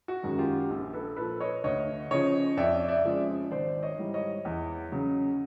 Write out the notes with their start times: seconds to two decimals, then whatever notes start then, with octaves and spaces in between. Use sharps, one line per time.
0.08 F#4
0.23 F#2 D#3 G#3
0.39 F4 G4
0.70 A#1
0.93 A4 B4
1.17 A#2 F3 A4 B4
1.40 C#5 D#5
1.64 D2 C#5 D#5
2.11 C#3 F3 C#5 D#5
2.57 F2 D5 E5
2.88 D5 E5
3.04 C#3 F3 G#3
3.51 G#1 C5 D5
3.83 C#5 D#5
3.98 G#2 E3 G3
4.14 C#5 D#5
4.45 E2
4.92 C#3 F#3